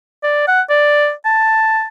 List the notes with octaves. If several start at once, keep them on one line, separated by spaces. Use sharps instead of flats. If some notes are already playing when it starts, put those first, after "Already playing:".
D5
F#5
D5
A5